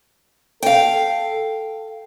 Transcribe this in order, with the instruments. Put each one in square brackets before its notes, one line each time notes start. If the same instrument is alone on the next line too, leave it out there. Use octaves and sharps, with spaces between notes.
[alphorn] A4 [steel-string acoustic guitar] F5 G5